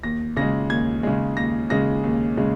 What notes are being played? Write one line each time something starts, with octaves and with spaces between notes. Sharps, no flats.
D#2 A#6
C#3 G#3 A#6
D#2 G#6
C#3 G#3
D#2 A#6
C#3 G#3 A#6
D#2
C#3 G#3